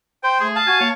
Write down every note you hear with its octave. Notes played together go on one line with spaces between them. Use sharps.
C5 G5
A3 G#4
F5 A5
F#4 G#5
A#3 C#5